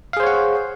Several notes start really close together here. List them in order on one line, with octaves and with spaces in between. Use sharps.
F5 G#4 C5 C#5 F#5